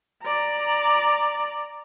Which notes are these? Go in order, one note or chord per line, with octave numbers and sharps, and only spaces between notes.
D5 A#5